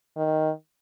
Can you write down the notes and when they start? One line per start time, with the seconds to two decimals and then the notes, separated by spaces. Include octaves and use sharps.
0.17 D#3